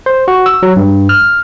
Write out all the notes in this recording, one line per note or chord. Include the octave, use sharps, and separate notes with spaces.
C5
F#4
E6
F#3
G2
F6